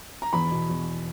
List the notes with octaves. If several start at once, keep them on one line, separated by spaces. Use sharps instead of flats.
A#5
E2 B5
B2
E2